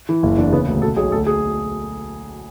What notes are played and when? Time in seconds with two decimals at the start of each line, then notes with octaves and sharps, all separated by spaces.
0.09 E3
0.23 F#1 E4
0.37 E2 D4
0.52 C#3 B3
0.68 D2
0.82 B2 A4
0.96 B1 G#4
1.12 D2 A4
1.27 G#4